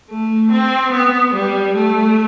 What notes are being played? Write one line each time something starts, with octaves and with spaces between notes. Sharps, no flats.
A3
C4
B3
G3
A3